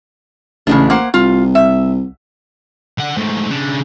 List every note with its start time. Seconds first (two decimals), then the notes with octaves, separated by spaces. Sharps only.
0.67 A1 C#3 G#3 D4
0.90 A#3 C5 F#5
1.14 C2 F4
1.55 E5
2.98 D3 F#5
3.17 G#2 A3
3.49 C#3 D4